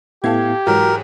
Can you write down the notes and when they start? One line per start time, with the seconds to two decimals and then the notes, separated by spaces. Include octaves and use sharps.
0.24 A2 B3 E4 G4 A4 F5 G#6
0.67 G#2 E3 F#3 F#4 A#4